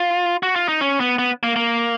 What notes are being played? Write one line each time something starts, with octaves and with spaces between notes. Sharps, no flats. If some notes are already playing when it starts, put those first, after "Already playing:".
Already playing: F4
F#4
F4
D#4
C#4
B3
B3
A#3
A#3